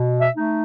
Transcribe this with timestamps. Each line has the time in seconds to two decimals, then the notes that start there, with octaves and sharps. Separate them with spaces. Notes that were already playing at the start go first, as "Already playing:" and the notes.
Already playing: B2
0.20 E5
0.35 A3 D#4